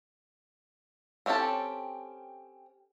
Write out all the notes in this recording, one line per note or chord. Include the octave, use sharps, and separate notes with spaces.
C4 C#4 E4 G4 A4